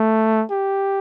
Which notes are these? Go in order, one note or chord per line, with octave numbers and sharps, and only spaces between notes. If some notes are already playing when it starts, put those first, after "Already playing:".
Already playing: A3
G4